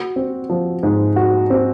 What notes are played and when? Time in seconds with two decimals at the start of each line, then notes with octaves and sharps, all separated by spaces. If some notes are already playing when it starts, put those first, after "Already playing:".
Already playing: F#4
0.16 C4
0.50 F3
0.83 G#2
1.16 F#4
1.50 C4